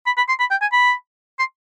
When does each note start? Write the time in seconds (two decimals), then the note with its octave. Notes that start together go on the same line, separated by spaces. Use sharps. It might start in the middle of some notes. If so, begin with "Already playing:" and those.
0.06 B5
0.17 B5
0.29 C6
0.40 B5
0.51 G5
0.62 G#5
0.73 B5
1.39 C6